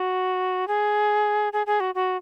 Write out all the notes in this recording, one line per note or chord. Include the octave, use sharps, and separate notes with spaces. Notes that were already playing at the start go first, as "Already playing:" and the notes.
Already playing: F#4
G#4
G#4
G#4
F#4
F#4